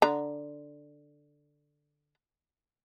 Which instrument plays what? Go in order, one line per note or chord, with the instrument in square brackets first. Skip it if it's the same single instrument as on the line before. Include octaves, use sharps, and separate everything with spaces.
[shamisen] D3 A#5